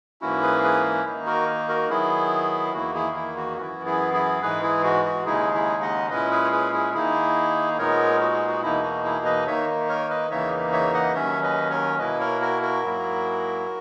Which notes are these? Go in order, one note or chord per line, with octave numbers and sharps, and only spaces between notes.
G#2 E3 A#3 C#4 E4 F#4
G#4 B4
G#4 B4
D#3 A#3 D#4
F#4 A#4
F#4 A#4
D#3 F#3 B3 E4 G#4
E2 D#3 A#3 E4 F#4
E4 G#4
E4
F#4
F#2 E3 B3 E4 F#4
E4 G#4
E4 G#4
G#2 E3 G#3 G#4 B4
E4 G#4
F#4
F#4
D#2 C#3 G#3 D#4 E4 G#4
E4 G#4
D#5 F#5
A#2 G#3 C#4 E4 B4 D#5
G#4 B4
C#5
G#4 B4
E4 G#4
D#3 A#3 D#4 E4 G#4
A#2 G#3 B3 D#4 A#4 C#5
F#4
G#4
F#4
E2 B2 A#3 D#4 E4
F#4
E4 G#4
B4 D#5
D#3 A#3 D#4 C#5 E5
A#4 C#5
B4 D#5
E2 C#3 E3 A#3 D#4 C#5 E5
C#5 E5
D#5 F#5
D#2 D#3 F#3 C#4 C#5 E5
B4 D#5
A#4 C#5
B2 A#3 E4 B4 D#5
A#4 C#5
F#4 A#4
F#4 A#4
G#2 F#3 A#3 E4